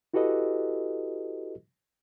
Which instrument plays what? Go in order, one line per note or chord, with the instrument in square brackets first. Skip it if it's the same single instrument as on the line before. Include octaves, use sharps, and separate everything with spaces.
[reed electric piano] E4 F#4 G4 A4 B4 D#5